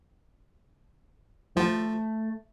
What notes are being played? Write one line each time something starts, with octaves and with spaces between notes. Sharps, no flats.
F3 A3